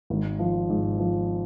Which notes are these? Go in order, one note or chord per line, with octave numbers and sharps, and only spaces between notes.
G#1
F3
G#2
F3